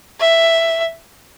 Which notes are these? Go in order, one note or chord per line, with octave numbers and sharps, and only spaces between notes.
E5